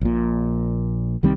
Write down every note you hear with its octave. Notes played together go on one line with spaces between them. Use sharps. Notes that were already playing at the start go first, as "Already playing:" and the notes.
A#1 A#2
C2 D#3 G3 C4